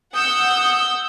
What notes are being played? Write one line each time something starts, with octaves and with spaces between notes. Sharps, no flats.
F#5 D#6 E6 G6